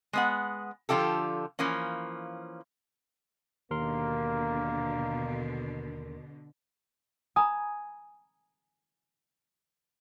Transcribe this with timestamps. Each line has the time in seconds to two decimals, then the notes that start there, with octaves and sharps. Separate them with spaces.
0.13 G#3 B3 F#5
0.89 D3 F3 F4 G4 A4
1.59 E3 F3 A#3 C#4
3.71 D#2 B2 D3 A#3 A#4 C6
7.36 G#5 A#5 B5 D#6